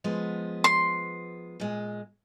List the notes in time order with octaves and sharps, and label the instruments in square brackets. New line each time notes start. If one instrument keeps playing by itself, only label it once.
[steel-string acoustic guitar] F3 G#3 B3
[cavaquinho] C6
[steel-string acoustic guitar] A#2 G#3